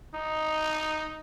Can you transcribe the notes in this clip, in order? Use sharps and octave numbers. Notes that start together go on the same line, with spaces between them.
D#4